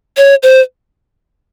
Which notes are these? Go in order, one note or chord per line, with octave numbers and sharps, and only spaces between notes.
C#5
C5